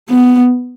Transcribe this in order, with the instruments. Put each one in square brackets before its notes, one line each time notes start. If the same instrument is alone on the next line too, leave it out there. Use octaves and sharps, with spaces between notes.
[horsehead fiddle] B3